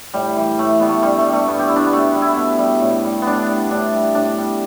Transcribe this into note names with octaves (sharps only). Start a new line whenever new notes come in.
A2 G3
E3 G3
A2 A3
E3 G3 B3
A3
G2 G3
A3
G3
A3
G2 B3
G4
G3 E4
D4
B3
B2 A3
G3
E4
B2
G3
A2
G3
A2 B3 D4
G3
A2 D4
G3
A2 D4
G3